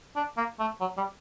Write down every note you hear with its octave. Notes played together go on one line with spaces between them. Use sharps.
D4
A#3
A3
F#3
G3